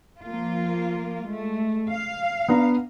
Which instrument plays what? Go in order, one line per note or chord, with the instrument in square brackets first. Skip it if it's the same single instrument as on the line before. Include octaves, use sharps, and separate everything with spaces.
[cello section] F3 A#3 F4
G#3 A3
F5
[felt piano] B3 D4 A#5